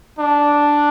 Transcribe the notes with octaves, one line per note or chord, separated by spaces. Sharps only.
D4